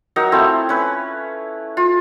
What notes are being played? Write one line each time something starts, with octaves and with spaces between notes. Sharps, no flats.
F#3 D#4 A#4 A#5
A3 C4 E4 F5
C#4 B4
F4